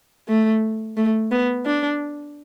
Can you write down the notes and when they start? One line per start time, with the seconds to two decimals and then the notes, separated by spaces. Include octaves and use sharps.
0.28 A3
0.97 A3
1.31 B3
1.66 D4